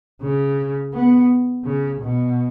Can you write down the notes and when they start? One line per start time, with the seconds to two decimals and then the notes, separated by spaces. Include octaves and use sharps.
0.21 C#3
0.93 B3
1.65 C#3
2.01 B2